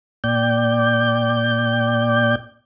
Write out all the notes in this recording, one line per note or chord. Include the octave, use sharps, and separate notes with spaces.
A#2 D5 G5 G6